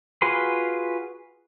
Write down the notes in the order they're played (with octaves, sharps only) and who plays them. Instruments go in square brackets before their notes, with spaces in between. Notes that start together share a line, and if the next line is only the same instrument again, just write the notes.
[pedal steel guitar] F4 F#4 G#4 B4 C6